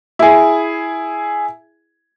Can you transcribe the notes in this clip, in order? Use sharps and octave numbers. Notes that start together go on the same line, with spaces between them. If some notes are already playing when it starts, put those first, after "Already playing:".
E4 G#4